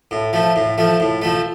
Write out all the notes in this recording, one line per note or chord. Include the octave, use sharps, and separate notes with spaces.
A2
F3 A3
A2
F3 A3
A2
F3 A3